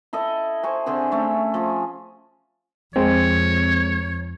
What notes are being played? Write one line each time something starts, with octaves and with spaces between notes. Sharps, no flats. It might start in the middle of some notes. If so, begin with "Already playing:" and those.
E4 A4 D#5
C5 G#5 C#6
D3 C4 G#4 C5
A3 C#4
F3 G#4
F2 G#3 C4 C#5